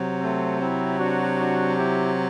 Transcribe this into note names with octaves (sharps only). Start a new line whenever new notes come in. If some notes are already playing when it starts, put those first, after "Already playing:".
Already playing: C3 F#3
A3 C4
C4 E4
D4 F#4
D4 F#4
E4 G4